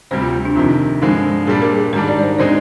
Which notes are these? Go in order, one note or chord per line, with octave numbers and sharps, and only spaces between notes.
D2 C3 G3 C5
F4
D4
F2 C3 D#3 F4
G2 D3 F3 G#3 C4
A#2 G3 D4 G#4
A#4
G#4
G#2 D#3 G3 D4 A#4
D5
D5
C5
D3 G#3 C4 D#4 C5